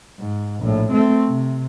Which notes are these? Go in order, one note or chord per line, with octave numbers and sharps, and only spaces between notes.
G#2
A#1 A2
A3 C4
C3